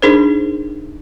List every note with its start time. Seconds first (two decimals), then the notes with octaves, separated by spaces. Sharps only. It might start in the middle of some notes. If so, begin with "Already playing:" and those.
0.02 D4 D#4 G#4 A#4 C5